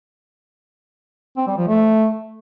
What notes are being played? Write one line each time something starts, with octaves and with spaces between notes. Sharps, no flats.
C4
G3
F3
A3